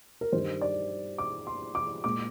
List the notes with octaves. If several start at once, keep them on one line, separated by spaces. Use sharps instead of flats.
A#4
G2 D#3 G3 C5
D5
D6
C6
D6
A#2 G#3 D6